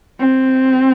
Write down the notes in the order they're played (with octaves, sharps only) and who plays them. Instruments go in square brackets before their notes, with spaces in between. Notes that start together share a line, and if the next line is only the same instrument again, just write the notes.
[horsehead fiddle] C4